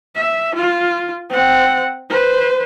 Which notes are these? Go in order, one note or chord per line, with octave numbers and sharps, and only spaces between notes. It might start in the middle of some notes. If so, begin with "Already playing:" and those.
E5
F4
C4 F#5
B4 C5